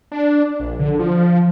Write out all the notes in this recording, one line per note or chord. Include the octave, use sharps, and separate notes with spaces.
D4
A#1
D3
F3